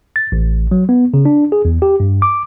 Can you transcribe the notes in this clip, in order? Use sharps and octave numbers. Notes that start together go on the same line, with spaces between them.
A6
A1
F#3
B3
C#3
D4
G#4
E2
G4
G2
D6